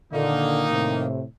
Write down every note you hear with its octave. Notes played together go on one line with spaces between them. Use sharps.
A#2 D3 D#3 A#3 D#4
A2 C3